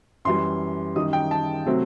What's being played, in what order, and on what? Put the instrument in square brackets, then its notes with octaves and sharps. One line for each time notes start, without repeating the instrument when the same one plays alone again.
[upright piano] F#2 E3 G3 C6
F#2 D#3 G3 D#4 D#6
G5
A5
C3 F#3 A3 C4